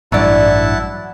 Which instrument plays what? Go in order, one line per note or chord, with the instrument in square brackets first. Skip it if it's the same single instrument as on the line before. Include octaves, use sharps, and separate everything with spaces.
[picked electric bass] A1 G2 [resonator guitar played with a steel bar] F#3 D5 [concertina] E4 F#5 A5